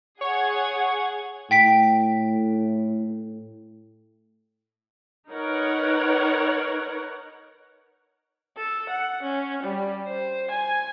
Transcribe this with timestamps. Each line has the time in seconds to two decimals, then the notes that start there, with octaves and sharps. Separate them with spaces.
0.21 G#4 C#5 F#5 G#6
1.51 A2 G5 B6 D7
5.30 D#4 A#4 B4 C#5 F#5
8.56 A4
8.90 F#5
9.23 C#4
9.63 G3
10.07 C5
10.51 G#5